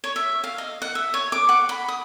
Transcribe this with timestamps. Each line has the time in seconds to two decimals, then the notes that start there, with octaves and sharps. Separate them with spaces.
0.04 C#5
0.16 E5
0.44 F5
0.58 D#5
0.82 F#5
0.95 E5
1.14 C#5
1.32 D6
1.49 F#5
1.69 B5
1.88 D#6